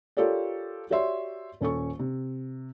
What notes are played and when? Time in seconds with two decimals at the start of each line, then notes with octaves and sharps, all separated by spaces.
0.17 F4 G4 A4 A#4 C#5 D5
0.90 F#4 G4 C#5 D5 E5 C6
1.61 D#1 C#4 A4 C#6
1.99 C3